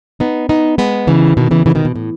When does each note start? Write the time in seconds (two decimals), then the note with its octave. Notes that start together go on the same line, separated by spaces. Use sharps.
0.20 B3 D#4
0.49 B3 D#4
0.78 G#3 B3
1.07 C#3 E3
1.37 B2 D#3
1.51 C#3 E3
1.66 C#3 E3
1.75 B2 D#3
1.85 B2
1.96 A2